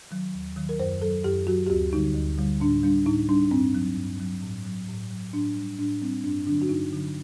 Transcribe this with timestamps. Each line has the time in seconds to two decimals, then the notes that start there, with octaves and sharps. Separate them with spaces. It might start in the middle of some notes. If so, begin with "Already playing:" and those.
0.11 D#3 F#3
0.34 D#2
0.57 D#3 F#3
0.69 A#4
0.79 F#2 C5
1.02 F#3 A4
1.24 F#2 G4
1.47 F#3 F#4
1.66 G4
1.70 D2 F#4
1.93 D3 G3 D#4
2.15 D2
2.38 D3 G3
2.60 A2 D4
2.83 G3 D4
3.06 A2 D#4
3.29 G3 D4
3.51 G2 C4
3.75 F#3
3.97 G2
4.20 F#3
4.43 A2
4.65 F#3
4.88 A2
5.10 F#3
5.33 A2 D4
5.56 G3
5.79 A2 D4
6.02 G3 C4
6.24 G2 D4
6.46 D3 D4
6.49 F#3
6.62 F#4
6.69 G2 D#4
6.93 D3 F#3